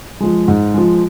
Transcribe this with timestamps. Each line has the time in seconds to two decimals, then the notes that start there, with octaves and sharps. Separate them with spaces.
0.20 F3 G#3
0.48 G#2
0.74 F3 G#3